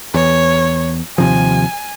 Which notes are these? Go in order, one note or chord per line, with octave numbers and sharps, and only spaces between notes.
E2 C#5
D#2 C3 F3 G#5